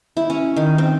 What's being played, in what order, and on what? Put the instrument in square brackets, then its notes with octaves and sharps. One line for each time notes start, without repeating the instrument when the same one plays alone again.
[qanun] E4
C#4
D#3
C4